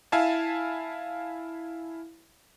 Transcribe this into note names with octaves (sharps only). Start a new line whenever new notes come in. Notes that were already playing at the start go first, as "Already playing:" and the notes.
E4 E5 F5 G#5 A5